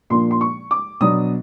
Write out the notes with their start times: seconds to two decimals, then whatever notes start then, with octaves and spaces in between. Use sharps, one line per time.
0.10 A#2 F3 A#3 D4 C6
0.31 C6
0.41 C#6
0.71 D6
1.00 B2 F#3 B3 D4 D#6